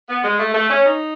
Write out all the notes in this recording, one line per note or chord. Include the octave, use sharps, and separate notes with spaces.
B3
G#3
A3
A3
C#4
D#4